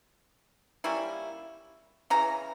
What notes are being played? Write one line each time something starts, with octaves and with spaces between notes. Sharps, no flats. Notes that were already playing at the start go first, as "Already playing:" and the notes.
G3 A#3 C#4 E4
C#3 E3 A#5